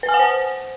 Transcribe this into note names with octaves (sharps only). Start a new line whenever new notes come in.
B4
G#5
F#5
C5